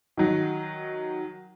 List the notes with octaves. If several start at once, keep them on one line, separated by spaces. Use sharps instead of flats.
D#3 F#3